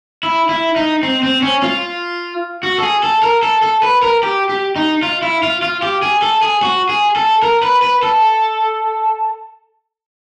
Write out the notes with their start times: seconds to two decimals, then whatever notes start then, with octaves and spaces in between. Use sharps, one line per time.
0.23 E4
0.49 E4
0.76 D#4
1.03 C4
1.23 C4
1.42 C#4
1.63 F4
2.63 F#4
2.78 A4
2.82 G#4
3.03 A4
3.23 A#4
3.43 A4
3.63 A4
3.83 B4
4.03 A#4
4.23 G4
4.49 G4
4.76 D#4
5.03 F4
5.23 E4
5.43 F4
5.62 F4
5.82 G4
6.02 G#4
6.22 A4
6.43 G#4
6.63 F#4
6.89 G#4
7.16 A4
7.43 A#4
7.63 B4
7.82 B4
8.03 A4